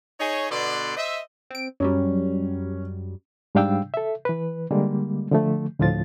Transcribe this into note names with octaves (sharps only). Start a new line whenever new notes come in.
D#4 G#4 C#5
B2 D3 B3 D5 C6
C5 D#5 E5
C4 D7
F#2 F#3 G3 C#4
G#2 G3 D4 F5 G5 E6
A4 E5
E3 B4
D3 G3 G#3 A#3
D3 F3 A3
D2 A2 F3 F4 A6